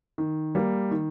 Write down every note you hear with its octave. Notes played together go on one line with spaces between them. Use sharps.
D#3
G3 A#3
D#3